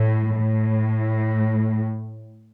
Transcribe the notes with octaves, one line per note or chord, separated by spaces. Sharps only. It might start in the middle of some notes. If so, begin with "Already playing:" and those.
Already playing: A2
A2